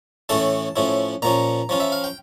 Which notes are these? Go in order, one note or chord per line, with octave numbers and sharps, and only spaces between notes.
A2 E3 A3 C#4 E4 A5
A2 F3 C#4 E4
A#2 F3 C#4 A#5
F3 C#4 F4
E5
F5
G5